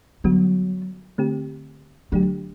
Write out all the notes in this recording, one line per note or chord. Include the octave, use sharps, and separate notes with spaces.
D3 F#3 G3 B3 F#4
D3 A3 C4 G4
D3 F#3 A3 D4 G4